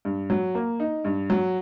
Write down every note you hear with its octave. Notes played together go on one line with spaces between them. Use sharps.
G2
F#3
A#3
D#4
G2
F#3